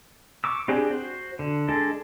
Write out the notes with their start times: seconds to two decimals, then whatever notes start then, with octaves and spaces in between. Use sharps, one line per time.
0.44 C#6 D6 E6
0.68 C4 D4 G4 G#4
0.90 F#4 C5
1.39 D3
1.68 G#3 D4 A4